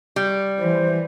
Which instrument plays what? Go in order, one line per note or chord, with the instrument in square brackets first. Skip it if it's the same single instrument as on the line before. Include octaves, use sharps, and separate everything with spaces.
[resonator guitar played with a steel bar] G3
[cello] E3 [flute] C5